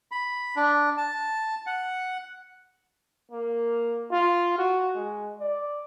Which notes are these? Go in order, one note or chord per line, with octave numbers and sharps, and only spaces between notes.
B5
D4
A5
F#5
A#3
F4
F#4
G#3
D5